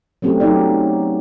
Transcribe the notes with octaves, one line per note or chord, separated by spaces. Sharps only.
F#3 A3 C4 C#4 G4
F#3 B3 D#4 D5